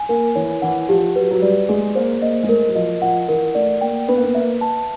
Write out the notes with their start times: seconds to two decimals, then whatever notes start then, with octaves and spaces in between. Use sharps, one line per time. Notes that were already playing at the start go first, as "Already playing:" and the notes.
Already playing: G#5
0.09 A#3 A#4
0.35 E3 C#5
0.62 E3 F#5
0.89 F3 G4
1.15 F#3 B4
1.31 F#3
1.42 G3 D5
1.69 G#3 G#4
1.95 A#3 C5
2.21 A#3 D#5
2.43 G#3
2.48 A3 A#4
2.68 F#3
2.75 F3 D#5
3.02 F3 F#5
3.28 E3 A#4
3.55 A3 D5
3.81 A#3 G5
4.08 B3 B4
4.16 A#3
4.24 B3
4.35 A#3 E5
4.61 A5